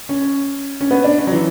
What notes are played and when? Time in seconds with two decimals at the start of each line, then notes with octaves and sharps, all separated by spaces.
0.09 C#4
0.81 C#4
0.91 B3
1.04 D4
1.18 C#4
1.27 F#3
1.32 E3